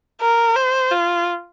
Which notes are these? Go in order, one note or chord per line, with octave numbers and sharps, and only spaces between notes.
A#4
C5
F4